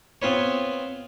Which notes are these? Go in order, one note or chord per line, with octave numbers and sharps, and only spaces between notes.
B3 C4 F4 B4 C#5